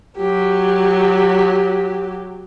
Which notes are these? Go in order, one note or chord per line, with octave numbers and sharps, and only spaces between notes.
F#3 G4